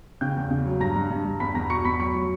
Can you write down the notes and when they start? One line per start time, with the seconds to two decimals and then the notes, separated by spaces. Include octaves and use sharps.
0.21 C#3 G5 G6
0.36 E2
0.51 C#3
0.66 F#3
0.80 G2 A#5 A#6
0.95 G2
1.10 G2
1.25 G2
1.40 E2 B5 B6
1.55 E2 A#5 A#6
1.70 B2 C#6 C#7
1.84 E2 B5 B6
2.00 F#3 C#6 C#7
2.15 F#3